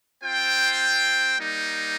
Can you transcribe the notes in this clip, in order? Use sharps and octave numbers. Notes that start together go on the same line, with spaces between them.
C4 F4 C5 G5
G3 A#3 D#4